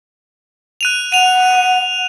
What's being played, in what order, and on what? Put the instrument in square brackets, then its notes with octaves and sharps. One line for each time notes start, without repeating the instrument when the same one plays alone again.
[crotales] F#6 D#7 F7
[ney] F#5 [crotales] D#7 F7